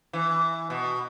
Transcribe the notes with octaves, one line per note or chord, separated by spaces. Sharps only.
E3
B2